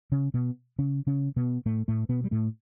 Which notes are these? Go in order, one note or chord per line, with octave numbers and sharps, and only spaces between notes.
C#3 C#4
B2 B3
C#3 C#4
C#3 C#4
B2 B3
A2 A3
A2 A3
B2 B3
G3
A2 A3